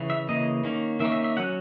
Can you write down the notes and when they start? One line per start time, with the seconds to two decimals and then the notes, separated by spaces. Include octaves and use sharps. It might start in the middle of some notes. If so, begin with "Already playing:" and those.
Already playing: C#3 E3
0.10 E5
0.29 C#3 E3 A#3 D#5
0.64 D#3 A#3 C#4
1.00 D#3 A#3 C#4 E5
1.12 E5
1.24 E5
1.37 F#3 C#4 F#5